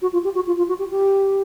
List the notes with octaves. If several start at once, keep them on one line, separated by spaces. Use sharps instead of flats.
F#4
F4
G4
F#4
F4
F4
F#4
G4
G4